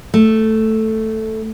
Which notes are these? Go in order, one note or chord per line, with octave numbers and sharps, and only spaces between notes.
A3